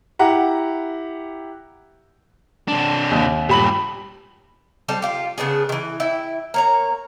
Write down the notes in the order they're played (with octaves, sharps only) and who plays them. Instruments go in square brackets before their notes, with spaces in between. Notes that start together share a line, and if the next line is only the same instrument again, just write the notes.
[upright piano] E4 G4 F#5 A#5
[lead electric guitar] C3 D4
[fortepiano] D#2
[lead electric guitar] G2 A#2 [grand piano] G4 B5 F#7
[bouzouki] G3 C4 A4
F4 G4
C#3 B3 D4 G#4
D#3 E3
E4 G5
A#3 C#5 A#5